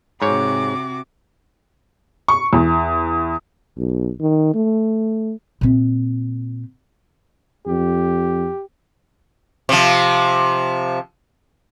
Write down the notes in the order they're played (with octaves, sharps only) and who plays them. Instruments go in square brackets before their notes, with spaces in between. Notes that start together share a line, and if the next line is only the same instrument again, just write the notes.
[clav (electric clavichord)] G#2 C#5 [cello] C3 F#4 [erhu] D6
[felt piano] C#6
E2
[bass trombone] B1
D#3
A3
[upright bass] A#2 C4
[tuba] F2 [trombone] G4
[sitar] C3 F3